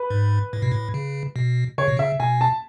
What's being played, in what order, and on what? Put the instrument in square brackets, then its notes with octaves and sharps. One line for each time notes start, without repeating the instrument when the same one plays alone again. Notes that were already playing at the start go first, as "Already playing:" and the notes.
Already playing: [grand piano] B4
[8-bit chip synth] G#2
A2
B2
A2
C#3
B2
[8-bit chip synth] C#3 [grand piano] C#5
[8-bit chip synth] B2
[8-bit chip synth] C#3 [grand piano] E5
[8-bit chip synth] B2 [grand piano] G#5
[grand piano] A5